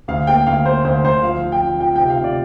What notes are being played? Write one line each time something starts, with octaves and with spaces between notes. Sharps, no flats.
D2 F5
A#3 G5
D2 F5
A#3 C5
D2 C5
D2 C5
F3 F5
F3
G5
F2
F3 G5
C3 G5
F5
C3
D5